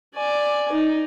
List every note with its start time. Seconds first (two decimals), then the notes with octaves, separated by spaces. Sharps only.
0.14 D5 G#5
0.72 D#4